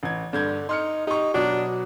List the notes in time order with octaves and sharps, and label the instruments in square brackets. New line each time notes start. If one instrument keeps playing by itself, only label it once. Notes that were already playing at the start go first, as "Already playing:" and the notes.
[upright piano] A1 G#6
[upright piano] G2 G6 G#6 [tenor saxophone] D3
[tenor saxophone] D#4 [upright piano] C6 F6 C#7
[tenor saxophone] D#4 [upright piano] G4 C#6
[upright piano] B2 F#3 B3 [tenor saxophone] D4